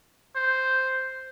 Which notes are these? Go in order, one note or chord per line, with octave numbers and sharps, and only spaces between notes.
C5